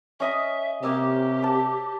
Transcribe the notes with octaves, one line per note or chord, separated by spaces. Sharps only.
C#4 D#5 E5 D#6
C3 A#3 G4 E5
A5 D6